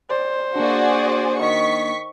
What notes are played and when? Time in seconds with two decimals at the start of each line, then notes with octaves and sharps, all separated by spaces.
0.10 C5 D5
0.56 A#3 D4 F#4 G#4 D5
1.39 D#3 C#6 B6